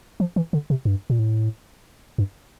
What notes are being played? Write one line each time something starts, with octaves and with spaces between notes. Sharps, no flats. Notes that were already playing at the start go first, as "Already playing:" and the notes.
F3
E3
D3
C3
G2
A#2
A2
G2